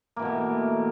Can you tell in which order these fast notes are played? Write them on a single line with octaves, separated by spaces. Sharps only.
A#3 E3 B2 A3